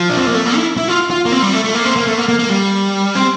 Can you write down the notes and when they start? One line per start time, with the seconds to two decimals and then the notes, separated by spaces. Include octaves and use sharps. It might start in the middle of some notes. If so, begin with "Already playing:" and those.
Already playing: F3
0.09 D4
0.17 C4
0.26 A#3
0.34 A3
0.45 A#3
0.56 E4
0.77 E4
0.88 F4
1.11 F4
1.26 A#3
1.32 C4
1.42 G3
1.54 A3
1.64 A3
1.74 A#3
1.85 C4
1.96 A#3
2.07 A3
2.18 A#3
2.29 A#3
2.39 A#3
2.49 G3
3.15 C4